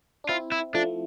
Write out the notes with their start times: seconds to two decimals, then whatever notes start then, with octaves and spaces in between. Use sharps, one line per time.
0.24 D4
0.29 C4 E4 F4
0.52 E4
0.74 F3 A3 D4